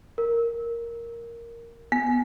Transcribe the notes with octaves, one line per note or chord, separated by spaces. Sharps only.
A#4
B3